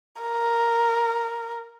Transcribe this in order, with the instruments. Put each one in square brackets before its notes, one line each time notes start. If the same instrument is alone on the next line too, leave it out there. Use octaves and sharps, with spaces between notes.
[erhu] A#4